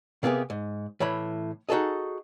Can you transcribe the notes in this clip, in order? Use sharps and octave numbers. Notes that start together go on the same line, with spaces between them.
C3 A#3 B3 G4 G#4
G#2
A2 E3 C#5 B5
D#4 F#4 G#4 A4 D#5